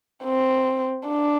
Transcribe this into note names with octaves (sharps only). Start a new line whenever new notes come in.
C4
D4